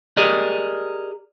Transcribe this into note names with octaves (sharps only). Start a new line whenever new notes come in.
G4 G#4 A#4 D5 D#5